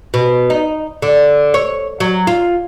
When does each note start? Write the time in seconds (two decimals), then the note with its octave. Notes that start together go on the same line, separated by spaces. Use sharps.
0.14 B2
0.50 D#4
1.02 D3
1.54 C#5
2.00 F#3
2.27 F4